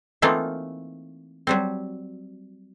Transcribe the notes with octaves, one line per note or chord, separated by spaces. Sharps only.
E3 A3 A#3 C4 D#4 F4
F#3 G3 C4